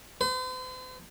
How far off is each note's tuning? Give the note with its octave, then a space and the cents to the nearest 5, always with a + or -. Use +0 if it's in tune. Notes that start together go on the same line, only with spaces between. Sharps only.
C5 -45